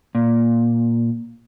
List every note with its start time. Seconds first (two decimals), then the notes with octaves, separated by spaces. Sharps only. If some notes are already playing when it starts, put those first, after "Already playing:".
0.15 A#2